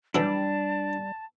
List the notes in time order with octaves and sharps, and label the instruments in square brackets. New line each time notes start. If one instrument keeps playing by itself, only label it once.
[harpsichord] E3 F#3 E4 [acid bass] G3 [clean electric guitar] D4 [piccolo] A5